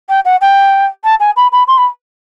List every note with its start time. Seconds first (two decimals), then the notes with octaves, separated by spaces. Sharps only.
0.09 G5
0.25 F#5
0.41 G5
1.04 A5
1.20 G#5
1.36 B5
1.52 B5
1.68 C6
1.78 B5